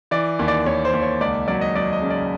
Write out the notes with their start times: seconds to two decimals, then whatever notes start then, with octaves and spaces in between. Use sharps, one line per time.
0.11 E3 D5
0.39 D#2
0.48 D5
0.66 D#2 C#5
0.85 C5
0.93 D#2
1.02 C#5
1.20 C#2 D5
1.48 F#3 D5
1.61 D#5
1.75 F#3 D5
1.93 D#5
2.01 C#3
2.10 D5